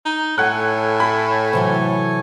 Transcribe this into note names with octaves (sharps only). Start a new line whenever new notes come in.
D#4
A2 A4 C#5 F#5 G#5 F#6
B5
C3 E3 F#3